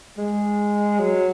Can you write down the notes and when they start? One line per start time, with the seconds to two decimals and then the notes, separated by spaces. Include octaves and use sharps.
0.18 G#3
0.99 F#3